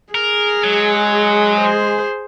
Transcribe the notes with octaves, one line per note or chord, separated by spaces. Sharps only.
G#4 A#4
F#3 G#3
G#4 C5